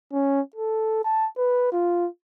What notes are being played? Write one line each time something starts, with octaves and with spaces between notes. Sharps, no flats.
C#4
A4
A5
B4
F4